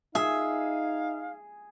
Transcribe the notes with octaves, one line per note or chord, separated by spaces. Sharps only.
D#4 G#4 E5 F5